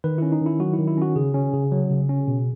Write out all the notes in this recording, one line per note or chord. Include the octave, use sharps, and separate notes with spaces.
D#3 B4
C#4 E4
D#4
D#3
E4
F#3 F#4
D#3 E4
E4
C#4 F#4
C#3 G#4
C#4
C#3
F#3
C#3
C#4
B2